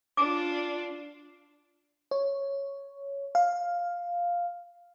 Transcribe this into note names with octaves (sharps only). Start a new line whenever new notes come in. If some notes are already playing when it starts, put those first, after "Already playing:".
D4 F4 D6
C#5
F5